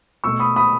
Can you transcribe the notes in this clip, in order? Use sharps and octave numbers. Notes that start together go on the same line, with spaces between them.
B2 A3 C#6 E6
B5 D#6
B5 D#6